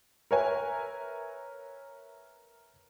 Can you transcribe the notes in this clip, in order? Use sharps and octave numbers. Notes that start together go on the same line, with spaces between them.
A#4 B4 C#5 E5 G#5